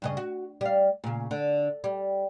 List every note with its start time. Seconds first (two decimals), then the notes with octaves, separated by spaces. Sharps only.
0.02 G2 C#3 D#5
0.17 F#4
0.61 G3 F5
1.04 A#2 C#3
1.31 D3
1.84 G3